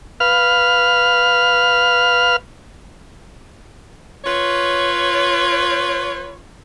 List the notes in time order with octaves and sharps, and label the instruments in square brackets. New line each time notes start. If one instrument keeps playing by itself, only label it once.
[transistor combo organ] B4 F5 F6
[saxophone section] F4 B4 C#5